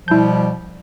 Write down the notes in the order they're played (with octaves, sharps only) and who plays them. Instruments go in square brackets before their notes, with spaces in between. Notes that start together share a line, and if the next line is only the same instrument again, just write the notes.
[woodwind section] B2 F3 G3 [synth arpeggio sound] E4 G6